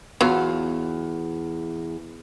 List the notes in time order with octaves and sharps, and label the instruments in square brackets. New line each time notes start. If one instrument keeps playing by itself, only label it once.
[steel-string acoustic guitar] E2 [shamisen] F#3 F4